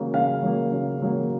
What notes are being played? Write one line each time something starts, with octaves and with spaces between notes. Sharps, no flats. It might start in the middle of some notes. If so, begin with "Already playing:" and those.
Already playing: C#3 F#3 A#3
C#3 F5
F#3 A#3
C#3
F#3 A#3